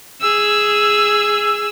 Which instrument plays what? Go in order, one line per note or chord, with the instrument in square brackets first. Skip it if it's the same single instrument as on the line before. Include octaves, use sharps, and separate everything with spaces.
[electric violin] G#4 E6